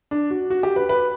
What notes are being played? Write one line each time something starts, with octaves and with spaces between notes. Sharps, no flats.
D4
F#4
F#4
G4
B4
B4